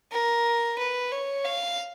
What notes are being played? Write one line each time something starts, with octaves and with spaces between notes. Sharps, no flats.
A#4
B4
C#5
F5